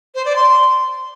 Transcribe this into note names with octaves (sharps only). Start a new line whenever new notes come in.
C5
D5
C6